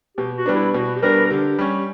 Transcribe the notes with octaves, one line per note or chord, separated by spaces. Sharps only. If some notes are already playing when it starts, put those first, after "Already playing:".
B2 G4
F#4
G3 B3 D4
E4
B2 F#4
G4
G3 B3 D4 A#4
A#4
D3 G4
G3 C#4